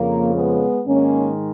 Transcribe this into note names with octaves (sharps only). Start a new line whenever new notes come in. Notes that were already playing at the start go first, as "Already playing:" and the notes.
Already playing: F2 C#3 F3 A#3
G#3 B3
G#2 D#3 G#3 A#3 C#4